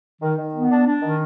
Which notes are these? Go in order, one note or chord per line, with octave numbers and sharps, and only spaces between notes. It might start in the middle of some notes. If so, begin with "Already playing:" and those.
D#3
D#3
B3
D4
D4
D#3